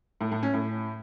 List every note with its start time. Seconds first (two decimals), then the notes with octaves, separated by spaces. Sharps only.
0.21 A2
0.32 A2
0.43 C#4
0.54 A2